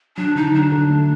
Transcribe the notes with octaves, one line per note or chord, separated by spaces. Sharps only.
F#3 D4
D3 D#4
F#3 D4
D3
A3